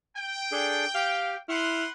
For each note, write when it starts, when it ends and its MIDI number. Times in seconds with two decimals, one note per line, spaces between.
0.14 1.38 79
0.52 0.85 62
0.52 0.85 68
0.52 0.85 69
0.95 1.35 67
0.95 1.37 77
1.48 1.86 64
1.48 1.88 71
1.48 1.88 78
1.48 1.88 84
1.48 1.84 89